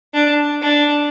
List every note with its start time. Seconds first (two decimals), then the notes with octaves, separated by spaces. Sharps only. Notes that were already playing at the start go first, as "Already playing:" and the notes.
0.14 D4
0.62 D4